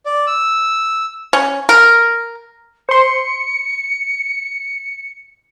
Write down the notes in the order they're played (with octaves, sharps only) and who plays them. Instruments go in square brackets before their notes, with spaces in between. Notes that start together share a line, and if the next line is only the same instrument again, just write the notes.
[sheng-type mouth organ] D5
E6
[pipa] C#4
A#4
[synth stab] C5 C6 [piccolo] C#7